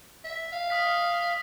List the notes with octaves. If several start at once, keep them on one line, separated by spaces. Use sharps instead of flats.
E5
F5
D#6 F6 B6